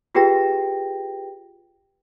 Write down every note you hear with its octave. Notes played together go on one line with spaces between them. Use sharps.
F4 G4 G#4 B4 G5 A#6